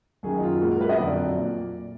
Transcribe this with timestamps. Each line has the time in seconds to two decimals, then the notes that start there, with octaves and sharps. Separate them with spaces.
0.23 F#2 D#3 F#3 G#4
0.38 D#4
0.43 F4
0.61 A#2 G#3 F#4
0.71 A#4
0.81 B4
0.89 D#5
0.99 F2 D3 F#3 D5
1.38 A#2